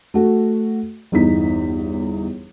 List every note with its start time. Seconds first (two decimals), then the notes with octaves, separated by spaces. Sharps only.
0.14 A3 F#4
1.12 G1 E2 D#4 B6